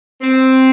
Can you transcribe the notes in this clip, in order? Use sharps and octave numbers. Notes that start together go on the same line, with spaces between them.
C4